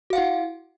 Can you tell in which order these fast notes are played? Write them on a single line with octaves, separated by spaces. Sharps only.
F#4 F5 F#5 E4